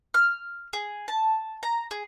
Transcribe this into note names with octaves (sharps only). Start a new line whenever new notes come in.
F6
G#4
A5
A#5
G#4